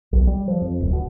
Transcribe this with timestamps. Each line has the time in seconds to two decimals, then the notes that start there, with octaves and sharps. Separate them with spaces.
0.12 B1
0.27 G3
0.48 F3
0.61 F2
0.81 D1
0.93 B2